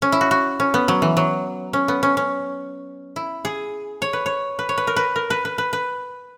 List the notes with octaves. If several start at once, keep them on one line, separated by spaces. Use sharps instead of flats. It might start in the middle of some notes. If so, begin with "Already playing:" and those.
C#4
E4
F#4
F#4
C#4
B3
F#3
E3
F#3
C#4
B3
C#4
C#4
E4
G#4
C#5
B4
C#5
B4
C#5
B4
A#4
B4
A#4
B4
B4
B4
B4